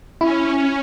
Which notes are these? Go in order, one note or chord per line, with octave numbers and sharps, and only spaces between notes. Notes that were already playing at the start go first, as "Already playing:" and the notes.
C#4 E4